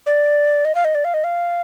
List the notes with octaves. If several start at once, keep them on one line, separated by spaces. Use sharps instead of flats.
D5
D#5
F5
D#5
D5
F5
D#5
F5